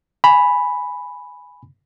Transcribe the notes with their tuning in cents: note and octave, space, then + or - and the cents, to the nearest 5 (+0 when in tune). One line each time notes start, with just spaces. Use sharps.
G#5 +0 B5 +0